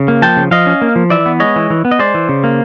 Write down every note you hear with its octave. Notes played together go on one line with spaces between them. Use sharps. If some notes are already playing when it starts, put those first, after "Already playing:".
Already playing: C#3
A#3
F3 G5 A5
C#3
F3 D#5 F5
C#4
A#3
F3
E3 D5 E5
B3
G#3 C#5 D#5
E3
E3
B3
D#5
G#3 C5 D5
E3
C#3
A#3